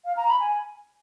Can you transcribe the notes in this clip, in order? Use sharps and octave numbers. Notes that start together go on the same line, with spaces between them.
F5
A#5
B5
G#5